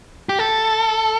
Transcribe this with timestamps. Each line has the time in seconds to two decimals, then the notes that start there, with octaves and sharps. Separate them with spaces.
0.29 G4
0.39 A4